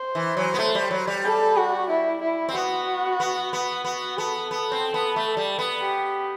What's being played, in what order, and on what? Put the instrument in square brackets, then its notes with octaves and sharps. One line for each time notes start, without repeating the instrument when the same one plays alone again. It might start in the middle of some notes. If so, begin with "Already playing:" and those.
Already playing: [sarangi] C5
[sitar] E3
F#3
B3
A3
G3
F#3
G3
[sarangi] A4
F#4
E4
E4
[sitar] C4
[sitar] B3 [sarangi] F#4
[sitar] B3
B3
[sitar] B3 [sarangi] F#4
[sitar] B3 [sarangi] A4
[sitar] B3 [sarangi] A4
[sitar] C4
B3
A3
G3
B3
[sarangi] G4